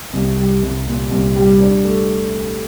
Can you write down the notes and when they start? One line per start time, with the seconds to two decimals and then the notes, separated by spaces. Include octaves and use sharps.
0.13 C2
0.37 G3
0.62 C2
0.87 A#2
1.11 C2
1.36 G3
1.60 D4
1.84 A3